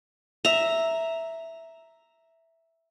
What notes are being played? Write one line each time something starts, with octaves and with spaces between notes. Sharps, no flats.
E5 A#5